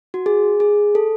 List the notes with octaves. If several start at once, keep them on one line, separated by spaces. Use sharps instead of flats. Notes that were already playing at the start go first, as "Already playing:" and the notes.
F#4
G#4
G#4
A4